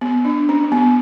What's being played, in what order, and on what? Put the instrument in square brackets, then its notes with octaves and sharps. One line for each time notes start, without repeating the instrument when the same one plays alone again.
[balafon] B3
D4
C#4
B3